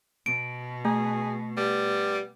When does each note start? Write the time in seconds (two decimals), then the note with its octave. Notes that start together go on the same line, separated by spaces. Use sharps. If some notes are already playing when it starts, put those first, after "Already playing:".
0.26 B2 D7
0.85 A3 G#4
1.57 G3 B3